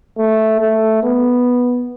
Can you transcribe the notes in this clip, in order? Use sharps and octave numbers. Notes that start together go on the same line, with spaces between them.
A3
A3
B3